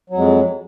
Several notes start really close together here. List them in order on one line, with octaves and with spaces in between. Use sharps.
F#3 F2 G#3